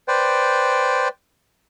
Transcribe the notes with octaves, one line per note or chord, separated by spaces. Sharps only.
B4 C5 D5 G5